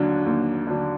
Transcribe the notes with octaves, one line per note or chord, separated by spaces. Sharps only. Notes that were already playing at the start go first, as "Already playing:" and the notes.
Already playing: D#2 D3 F#3 D4
D#2
D3 F#3 D4